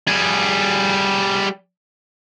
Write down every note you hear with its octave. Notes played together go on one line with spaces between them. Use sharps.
G3 G#4